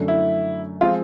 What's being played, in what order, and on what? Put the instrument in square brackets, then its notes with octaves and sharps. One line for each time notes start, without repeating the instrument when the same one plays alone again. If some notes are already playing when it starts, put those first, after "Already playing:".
Already playing: [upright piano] F#2 D3 F#3 A3
[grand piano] E4
[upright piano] F3 G#3 C4 [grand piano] F4